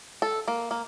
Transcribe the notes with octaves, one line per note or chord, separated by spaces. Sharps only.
A4
A#3
A#3